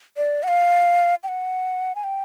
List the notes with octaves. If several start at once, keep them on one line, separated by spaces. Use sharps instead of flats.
D5
F#5
F5
G5
F#5
G#5
G5